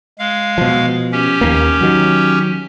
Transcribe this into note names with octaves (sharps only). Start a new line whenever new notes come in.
G#3 F5
B2 F3
C#4 G4
D#2 A#3
D#3 F#3